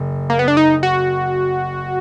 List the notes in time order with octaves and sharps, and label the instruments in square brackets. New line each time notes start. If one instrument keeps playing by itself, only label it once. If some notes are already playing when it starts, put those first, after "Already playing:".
Already playing: [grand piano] F#1
[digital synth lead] A#3
B3
D4
D#4
F#4